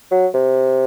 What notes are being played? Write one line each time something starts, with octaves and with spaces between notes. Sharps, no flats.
F#3
C3